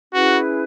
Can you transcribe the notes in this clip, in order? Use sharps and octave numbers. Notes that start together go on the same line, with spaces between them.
C#4 E4 F#4 G#4 B4